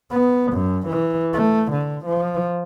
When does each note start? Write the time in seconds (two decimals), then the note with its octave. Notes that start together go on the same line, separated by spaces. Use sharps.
0.11 B3
0.52 F#2
0.88 E3
1.33 A3
1.72 D3
2.06 F3